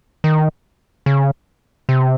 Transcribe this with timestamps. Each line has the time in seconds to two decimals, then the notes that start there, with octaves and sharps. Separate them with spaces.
0.24 D#3
1.06 C#3
1.89 C3